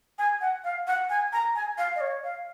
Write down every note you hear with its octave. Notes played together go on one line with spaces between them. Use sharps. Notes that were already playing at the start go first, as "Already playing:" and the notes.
G#5
F#5
F5
F#5
G#5
A#5
G#5
F5
D#5
C#5
F5